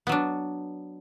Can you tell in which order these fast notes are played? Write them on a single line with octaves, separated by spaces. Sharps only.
B3 F#3 D4